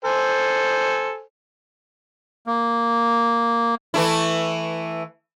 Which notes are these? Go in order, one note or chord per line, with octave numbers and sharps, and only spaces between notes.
A4 C5 G#5
A#3
E3 A3 E4